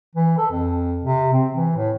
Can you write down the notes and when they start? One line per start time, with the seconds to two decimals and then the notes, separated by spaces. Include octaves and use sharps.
0.16 E3
0.38 A4
0.51 F2
1.04 C3
1.33 C4
1.53 E3
1.76 A2